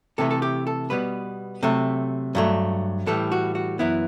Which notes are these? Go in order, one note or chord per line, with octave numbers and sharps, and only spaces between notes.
C3 E3 A3 A4
A4
G4
A4
B2 G3 B3 B4
C3 F#3 A3
G2 F#3 A3
A2 E3 G3 A4
F#4
F#4
F#2 E3 B3 E4